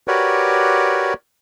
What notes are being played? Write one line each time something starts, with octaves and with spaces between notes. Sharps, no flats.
F#4 G4 A#4 B4 C#5 D5